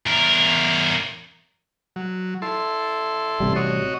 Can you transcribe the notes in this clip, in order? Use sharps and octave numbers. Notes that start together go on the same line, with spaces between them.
E2 A#4
F#3
E4 A4 C6
A1 C3 G3
F#4 C#5 D#5